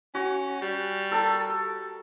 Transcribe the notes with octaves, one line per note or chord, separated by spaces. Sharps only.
C#4 F#4
G3
A4 A#4 A5